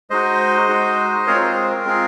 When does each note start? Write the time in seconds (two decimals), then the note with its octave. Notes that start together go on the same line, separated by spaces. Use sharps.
0.10 G#3 D#4 F#4 C5 D#5
0.68 G#3 D#4 F#4
1.27 G#3 C4 F4 G#4 A#4 C#5
1.41 G#4 C5
1.56 G#4
1.71 A#4
1.85 G#3 C4 F4 G#4